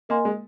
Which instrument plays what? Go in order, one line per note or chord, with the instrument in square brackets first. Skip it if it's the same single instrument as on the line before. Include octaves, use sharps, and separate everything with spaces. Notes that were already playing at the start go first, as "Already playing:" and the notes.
[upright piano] A#3 [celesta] A#4 D#5 G#5 C6
[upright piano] G#3